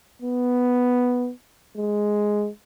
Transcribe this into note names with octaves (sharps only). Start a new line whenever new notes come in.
B3
G#3